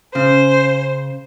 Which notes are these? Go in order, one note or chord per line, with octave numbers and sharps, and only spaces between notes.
C#3 C5